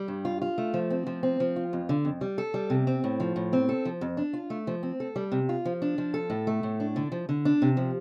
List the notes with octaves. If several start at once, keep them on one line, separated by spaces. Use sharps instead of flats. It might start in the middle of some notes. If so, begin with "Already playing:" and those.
Already playing: G3
G2
F4
F4
A3
F3
C4
F3
C4
F3
F4
F2
D3
F2
G3
A4
G3
C3
C4
A2
F3
A2
C4
A4
F3
F2
D4
F4
A3
F3
C4
A4
G3
C3
F4
F3
D4
F3
A4
A2
A3
A2
D4
D3
F3
D3
D4
C3
F3